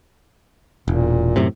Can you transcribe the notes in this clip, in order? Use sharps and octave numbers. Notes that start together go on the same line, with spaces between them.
E1 A#2
F#2 A2 C3